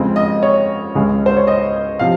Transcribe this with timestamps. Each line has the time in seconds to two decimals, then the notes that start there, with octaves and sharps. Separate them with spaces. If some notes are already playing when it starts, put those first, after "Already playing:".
Already playing: F2 C#3 G#3 C4
0.16 D#5
0.43 C#5
0.95 C#2 C#3 G#3
1.26 C5
1.37 C#5
1.47 D#5
1.99 C3 F3 F5